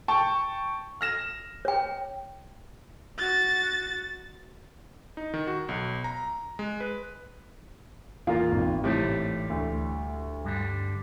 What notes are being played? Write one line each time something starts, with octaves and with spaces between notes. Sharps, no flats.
G5 A5 C#6
F6 A#6 E7
C#5 G5
F#4 A6
D#4
D#3
F#4
B1
A#5
G#3
B4
E2 A#2 F4 A#4 F5
G#1
A2 C3 E3 G3 A3
D2
G2 D3 G3